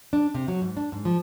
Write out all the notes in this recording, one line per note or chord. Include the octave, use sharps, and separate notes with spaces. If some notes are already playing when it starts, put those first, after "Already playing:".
D4
C3
F#3
G#2
D4
G#2
F3